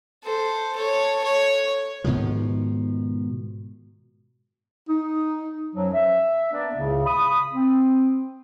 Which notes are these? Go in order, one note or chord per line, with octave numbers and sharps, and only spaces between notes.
A4 C5
A4 C#5
C#5
G#2 B2 D#3 F3
D#4
F#2 F3 F#3
E5
A#3 B3 D4 D5
C#2 A2 C#3
B5 D#6
C4